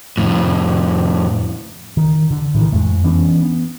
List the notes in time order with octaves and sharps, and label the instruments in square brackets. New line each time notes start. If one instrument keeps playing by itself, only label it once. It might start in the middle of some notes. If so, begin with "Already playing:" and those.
[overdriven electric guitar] F2 A2
[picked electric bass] D#3
D3
A2 D#3 E3
F2 G#3 A3
E3 B3 C#4 D4
B3